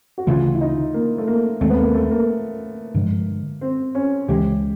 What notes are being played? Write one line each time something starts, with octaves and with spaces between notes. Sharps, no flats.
F#4
D2 C#3 E3 A3 F4
E4
D#4
A#3
A3
A#3
D#2 D#3 G#3 A3 C4
B3
A#3
A3
A#3
G2 D3 F3 G#3
C4
C#4
C#2 C#3 E3 G#3 G4